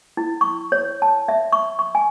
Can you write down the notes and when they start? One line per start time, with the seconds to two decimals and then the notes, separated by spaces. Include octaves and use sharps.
0.17 E4
0.41 C#6
0.72 C#5
1.02 A5
1.28 E5
1.52 C#6
1.79 C#6
1.95 G#5